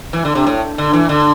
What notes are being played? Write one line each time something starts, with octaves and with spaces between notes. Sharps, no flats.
E3
D3
C3
A2
D3
E3
D3